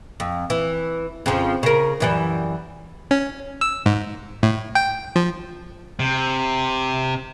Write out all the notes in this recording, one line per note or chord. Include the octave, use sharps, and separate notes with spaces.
F2
E3
F2 C#3 F3
C#3 A#4
F#2 E3 G3
C#4
E6
G#2
A2
G5
F3
C3